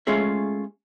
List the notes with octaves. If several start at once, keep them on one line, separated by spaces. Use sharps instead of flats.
G#3 A3 C#4 F4 G#4 E5